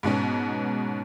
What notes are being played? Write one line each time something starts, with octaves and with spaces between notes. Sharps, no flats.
G#2 B2 B3 C#4